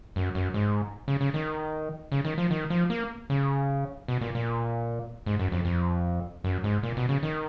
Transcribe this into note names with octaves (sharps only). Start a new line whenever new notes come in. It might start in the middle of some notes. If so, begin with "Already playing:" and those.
F#2
F#2
G#2
C#3
C#3
D#3
C#3
D#3
F3
D#3
F3
A#3
C#3
B2
A#2
A#2
G#2
F#2
F2
F2
F#2
G#2
A#2
B2
C#3
D#3